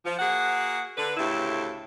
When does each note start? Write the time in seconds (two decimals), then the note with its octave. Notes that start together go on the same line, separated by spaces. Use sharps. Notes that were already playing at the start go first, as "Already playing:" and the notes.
0.05 F3
0.19 A#3 F#4 G#4 F#5
0.97 D3 B4
1.17 D2 A2 C#3 E4 G4 E5